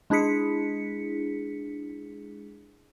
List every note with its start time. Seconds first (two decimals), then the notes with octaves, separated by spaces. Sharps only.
0.10 G#3 D4 E4 G#4 B6 C#7